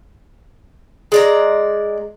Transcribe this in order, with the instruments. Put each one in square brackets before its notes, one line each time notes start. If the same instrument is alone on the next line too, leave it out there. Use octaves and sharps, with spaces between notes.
[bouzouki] G#3 D5 A#5